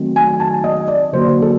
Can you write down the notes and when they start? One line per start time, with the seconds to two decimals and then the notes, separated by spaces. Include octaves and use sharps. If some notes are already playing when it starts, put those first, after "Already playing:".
Already playing: D#3 F#3 A3 C4
0.16 G#5
0.40 A5
0.64 D#5
0.88 D5
1.12 D3 F#3 A#3 D4 C5
1.42 A4